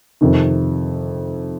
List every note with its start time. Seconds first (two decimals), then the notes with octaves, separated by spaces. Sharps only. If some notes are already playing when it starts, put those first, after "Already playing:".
0.21 F2 C3 D#3